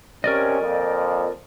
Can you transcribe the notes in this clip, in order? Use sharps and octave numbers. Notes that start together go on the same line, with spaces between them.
C3 C#4 A#4 D5 D#5
F2 A#2 F3